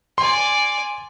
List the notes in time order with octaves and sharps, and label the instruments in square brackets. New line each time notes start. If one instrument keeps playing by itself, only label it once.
[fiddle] D5 G#5 [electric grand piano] C6